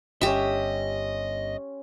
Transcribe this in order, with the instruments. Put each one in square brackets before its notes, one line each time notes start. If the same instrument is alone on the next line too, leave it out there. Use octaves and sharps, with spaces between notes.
[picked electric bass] G1 [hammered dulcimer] C#4 C6 [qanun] G4 E5 [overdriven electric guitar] D#5